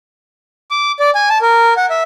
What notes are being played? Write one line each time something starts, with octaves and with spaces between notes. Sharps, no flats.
D6
D5
G#5
A5
A#4
F#5
E5